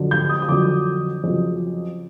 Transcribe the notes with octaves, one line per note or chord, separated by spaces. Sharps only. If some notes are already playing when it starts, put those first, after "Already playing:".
Already playing: F2 D3 F#3
G6
D#6
D#6
F2 D3 F#3 D6
F2 C#3 F#3